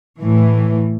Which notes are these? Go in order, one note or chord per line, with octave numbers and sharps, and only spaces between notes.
A2 E3